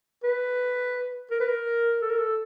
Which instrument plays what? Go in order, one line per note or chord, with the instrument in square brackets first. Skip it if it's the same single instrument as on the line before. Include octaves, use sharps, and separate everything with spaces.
[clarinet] B4
A#4
B4
A#4
A4
A#4
A4